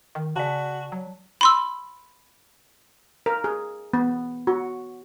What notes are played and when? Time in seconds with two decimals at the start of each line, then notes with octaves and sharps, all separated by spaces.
0.15 D#3
0.36 C#3 F#4 D5 A5
0.92 F#3
1.41 B5 C6 E6
3.26 A#4
3.44 G#4
3.93 B3
4.47 F#4